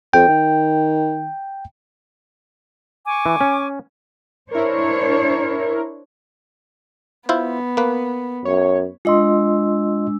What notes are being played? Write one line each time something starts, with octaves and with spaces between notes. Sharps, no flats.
F2 G5
D#3
G#5 C#6 D6
E3
C#4
D4 E4 A#4 C5 C#5
B3 E4 F4 C5
A#3 B4
F#2 C#5
G#3 D4 F4 D#5 C6 E6